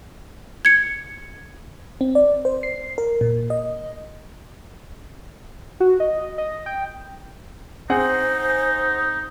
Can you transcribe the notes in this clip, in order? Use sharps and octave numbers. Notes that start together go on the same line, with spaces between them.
G#6 C#7
C4
D5
C5
C7
A#4
A#2
D#5
F#4
D#5
D#5
G5
C4 D#4 G#4 C5 F#5